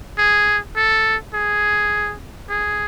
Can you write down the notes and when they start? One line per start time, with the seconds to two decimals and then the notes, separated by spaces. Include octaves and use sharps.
0.18 G#4
0.76 A4
1.34 G#4
2.50 G#4